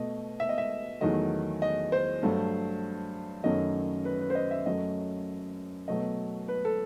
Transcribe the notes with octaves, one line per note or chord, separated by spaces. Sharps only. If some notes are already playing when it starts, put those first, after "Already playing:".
Already playing: B2 A3 D#5
E5
D#5
E5
E2 D#3 F#3 A3 D#5
D#5
C5
G2 F#3 A3
F#2 D#3 F#3 A3 D#5
B4
B4
C5
D#5
E5
F#2 F#3 A3 D#5
B2 F#3 A3 D#5
B4
A4